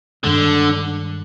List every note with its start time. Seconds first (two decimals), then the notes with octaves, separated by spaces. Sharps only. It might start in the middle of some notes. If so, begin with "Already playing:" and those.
0.24 G2 D3 D#3 G#3